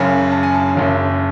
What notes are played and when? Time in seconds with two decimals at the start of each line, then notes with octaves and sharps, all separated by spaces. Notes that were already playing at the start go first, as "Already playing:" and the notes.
Already playing: F#1 F#2 C#3 G#5
0.32 A5
0.43 G#5
0.54 A5
0.75 F#1 F#2 C#3